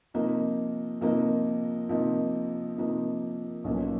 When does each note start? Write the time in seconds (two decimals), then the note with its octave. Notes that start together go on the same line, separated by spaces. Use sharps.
0.14 C3 F3 A#3 D#4
1.01 C3 F3 A#3 D#4
1.89 C3 F3 A#3 D#4
2.77 C3 F3 A#3 D#4
3.64 B1 A#2 F3 A#3 C#4